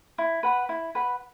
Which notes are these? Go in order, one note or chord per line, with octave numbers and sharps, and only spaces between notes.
E4
B4 F#5 B5
E4
B4 F#5 B5